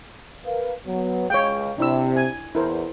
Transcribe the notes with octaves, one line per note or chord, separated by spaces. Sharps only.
A#4 B4 F5
F#3 B3
C#2 G#3 C#5 F5 G5
C3 D4 E4 E6
G#5
E2 E4 A#4 C5